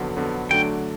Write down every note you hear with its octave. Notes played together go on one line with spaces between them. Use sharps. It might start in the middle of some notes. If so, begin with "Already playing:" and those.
Already playing: F2 D3 F#3 B3
F2 D3 F#3 B3
D3 F#3 A3 D4 G5